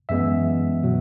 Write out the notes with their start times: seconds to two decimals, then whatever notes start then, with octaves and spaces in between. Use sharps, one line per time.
0.09 F#2 E3 G#3 B3 E5
0.83 B2 F#3